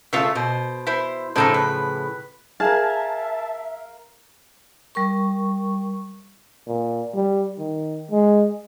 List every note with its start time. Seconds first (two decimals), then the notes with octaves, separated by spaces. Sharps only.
0.13 C#3 A3 F4 C#5 E5
0.35 B2 C5
0.87 E4 C5
1.36 A2 C#3 F3 D#4 A4 C5
1.54 B4
2.60 G#4 A#4 E5 F5 A5
4.95 G3 A#4 C#6
6.67 A#2
7.15 G3
7.59 D#3
8.11 G#3